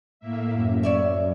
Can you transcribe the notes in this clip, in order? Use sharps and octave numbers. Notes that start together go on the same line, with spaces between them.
A2 A#3 E5
F#2
C#5 D5 E5